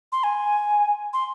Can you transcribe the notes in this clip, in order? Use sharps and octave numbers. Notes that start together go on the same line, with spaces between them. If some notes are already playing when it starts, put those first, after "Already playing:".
C6
G#5
C6